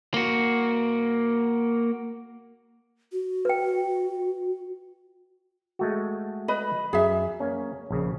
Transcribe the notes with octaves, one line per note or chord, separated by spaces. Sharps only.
A#3 F#4
F#4
B4 G5
G#3 A3 F#4
B4 D#5 B5
F#2 G#4 E5
A#3 C#4
A#1 C#3